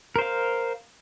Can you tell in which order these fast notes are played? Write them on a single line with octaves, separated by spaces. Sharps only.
A#4 C5 F5